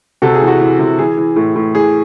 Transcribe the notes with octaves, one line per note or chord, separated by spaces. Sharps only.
C3 F#4 A4
G#4
E3
F#4
E3
C3
E3 G#4
E3
A2
A2
E3 G#4